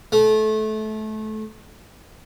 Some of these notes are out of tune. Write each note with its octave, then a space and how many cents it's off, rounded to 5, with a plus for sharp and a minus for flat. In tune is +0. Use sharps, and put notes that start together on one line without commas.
A3 -25